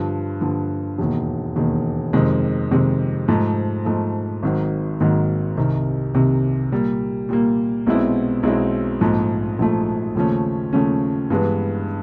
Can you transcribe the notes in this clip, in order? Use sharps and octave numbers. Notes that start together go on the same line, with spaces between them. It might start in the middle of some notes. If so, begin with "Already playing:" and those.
Already playing: G2 D3 F3
G2 D3 F3
E1 D#2 D#3
E1 D#2 D#3
F2 C3 D#3 G#3
F2 C3 D#3 G#3
G#2 F3 A3
G#2 F3 A3
G#1 G#2 D#3 F#3
G#1 G#2 D#3 F#3
C2 C3 D#3
C2 C3 D#3
A#2 G3 A#3
A#2 G3 A#3
B1 B2 G#3 C4 E4
B1 B2 G#3 C4 E4
A#1 G#2 F3 A3
A#1 G#2 F3 A3
D#2 C#3 F3 A3 C#4
D#2 C#3 F3 A3 C#4
G2 E3 G#3 B3